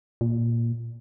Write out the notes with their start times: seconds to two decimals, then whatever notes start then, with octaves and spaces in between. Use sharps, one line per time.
0.21 A#2